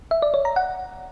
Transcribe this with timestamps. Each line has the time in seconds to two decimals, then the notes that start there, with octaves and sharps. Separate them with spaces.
0.11 E5
0.22 D5
0.34 C#5
0.45 A#5
0.56 F#5